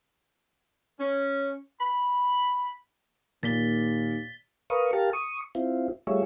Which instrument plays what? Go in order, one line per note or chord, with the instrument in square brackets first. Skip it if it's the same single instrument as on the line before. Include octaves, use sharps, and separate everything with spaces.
[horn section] C#4
B5
[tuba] D#2 [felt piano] A#2 [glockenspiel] A6 B6 G7
[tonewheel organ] A#4 B4 F5 C#6 D#6
G4 A#4 F5 A5
C#6 D#6
C4 E4 F4
G3 A3 F4 G#4 C#5 E5